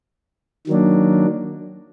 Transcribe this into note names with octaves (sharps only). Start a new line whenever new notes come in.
D#3 F#3 A#3 D4